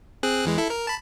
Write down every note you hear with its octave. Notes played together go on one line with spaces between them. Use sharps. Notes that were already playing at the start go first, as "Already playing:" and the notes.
C4 G#4 F#6
E2 E3 G#3
E4 A4
A#4
A5 B5